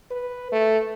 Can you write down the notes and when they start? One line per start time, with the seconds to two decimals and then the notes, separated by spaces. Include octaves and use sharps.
0.11 B4
0.52 A3